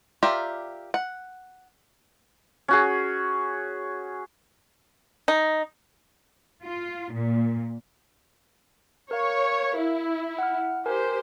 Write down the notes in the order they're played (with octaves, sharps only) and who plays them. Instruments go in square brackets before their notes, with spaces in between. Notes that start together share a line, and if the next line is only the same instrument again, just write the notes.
[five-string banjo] F4 G4 A#4 D5 E5
F#5
[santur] C#4 F#4 G#4
[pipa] D#4
[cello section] F4
A#2
[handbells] A#4 F5 [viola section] C#5
[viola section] E4
[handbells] F#5 F6
[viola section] G4 C5 [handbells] A#4 G#5